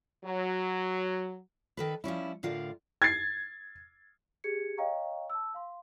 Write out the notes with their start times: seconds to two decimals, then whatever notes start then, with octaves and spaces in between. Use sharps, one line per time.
0.24 F#3
1.77 D#3 A4 B4
2.04 F3 G3 C#4 E4
2.43 A2 D3 F4 A#4 D5
3.02 G#6 A6 C7
4.44 G4 G#4 G#6 C#7
4.78 C#5 D#5 F5 G5 A#5 C#6
5.30 A5 E6
5.54 F5 C6